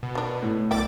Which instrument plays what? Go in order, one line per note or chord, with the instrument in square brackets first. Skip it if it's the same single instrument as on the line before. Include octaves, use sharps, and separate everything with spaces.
[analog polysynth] B2
[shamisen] D#3 D4
[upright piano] A2
[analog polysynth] B1 D6 A6 [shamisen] D5 E5 G5